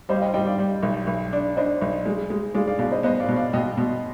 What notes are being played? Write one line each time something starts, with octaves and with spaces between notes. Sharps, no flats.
G3 C5 D#5
F5
D#5 G5
G3 D#5 G5
D5 F5
G3
B1
B1
D4
D4 C5 D#5
B1
G#3
G#3
G#3 D5 F5
D5 F5
B2 D5 F5
C5 D#5
B3 C5 D#5
D5 F5
B2
D5 F5
B2 D#5 G5
B2